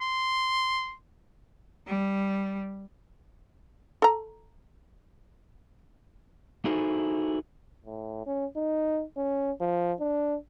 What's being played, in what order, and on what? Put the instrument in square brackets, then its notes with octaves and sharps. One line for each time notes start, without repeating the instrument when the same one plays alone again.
[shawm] C6
[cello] G3
[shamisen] A4 A#5
[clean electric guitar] D#4 E4 F#4 G#4 A4 C5
[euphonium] A2
C#4
D#4
C#4
F3
D4